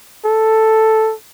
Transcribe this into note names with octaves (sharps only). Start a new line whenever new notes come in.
A4